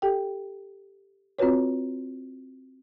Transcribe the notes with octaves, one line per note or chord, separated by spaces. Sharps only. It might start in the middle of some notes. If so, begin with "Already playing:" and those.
G4 A4 G5
C4 F4 F#4 B4 C#5